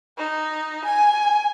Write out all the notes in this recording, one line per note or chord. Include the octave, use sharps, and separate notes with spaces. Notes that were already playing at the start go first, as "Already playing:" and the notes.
D#4
G#5